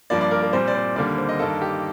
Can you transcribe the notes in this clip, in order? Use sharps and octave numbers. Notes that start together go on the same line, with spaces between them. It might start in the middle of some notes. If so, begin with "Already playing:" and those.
G2 F3 A#3 D5
D5
A#4
A#4
A#2 G3 C4 C5
D5
C5
D#2 D3 G3 A#3 D5
C5
D#5
G2 D#3 A#3 A4
G4